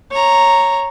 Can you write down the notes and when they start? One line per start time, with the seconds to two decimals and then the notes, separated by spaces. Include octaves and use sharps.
0.11 C#5 A#5